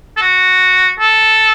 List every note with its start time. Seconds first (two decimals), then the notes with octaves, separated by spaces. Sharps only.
0.17 A4
0.21 F#4
1.00 A4